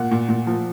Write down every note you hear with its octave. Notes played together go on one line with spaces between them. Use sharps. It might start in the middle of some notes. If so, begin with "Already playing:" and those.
Already playing: A#2 F#5
A#2
A#2
F3